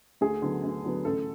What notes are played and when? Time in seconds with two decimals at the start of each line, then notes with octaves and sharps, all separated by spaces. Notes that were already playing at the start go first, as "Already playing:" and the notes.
0.21 D2 G#4
0.42 D3 F#3 B3
0.64 D2
0.84 D3 F#3 B3
1.05 A1 A4